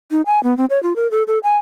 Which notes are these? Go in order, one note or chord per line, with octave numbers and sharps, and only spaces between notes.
D#4
G#5
B3
C4
C#5
F4
A#4
A4
A4
G#5